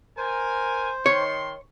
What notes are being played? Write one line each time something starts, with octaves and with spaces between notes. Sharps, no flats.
A#4 C5 G#5
D#3 C#5 C6